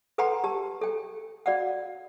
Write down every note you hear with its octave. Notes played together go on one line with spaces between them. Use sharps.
A4 B4 F#5 G5 A#5 C6
G4 A5
A4 G5
F#4 D5 F5 F#5